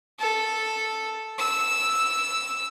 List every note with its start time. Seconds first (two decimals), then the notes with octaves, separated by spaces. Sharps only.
0.20 A4
1.39 E6